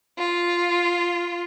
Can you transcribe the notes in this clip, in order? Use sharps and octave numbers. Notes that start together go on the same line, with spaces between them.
F4